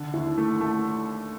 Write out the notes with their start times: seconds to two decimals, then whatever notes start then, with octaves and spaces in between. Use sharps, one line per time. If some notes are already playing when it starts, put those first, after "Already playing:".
Already playing: D3
0.14 D#2 E4
0.37 A3
0.61 A3